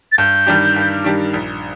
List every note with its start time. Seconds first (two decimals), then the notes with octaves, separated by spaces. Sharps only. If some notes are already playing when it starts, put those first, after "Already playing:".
0.12 A6
0.18 G2 G6
0.47 D#3 G3 D4 G4
0.76 G2
1.04 D#3 G3 D4 G4
1.34 A#1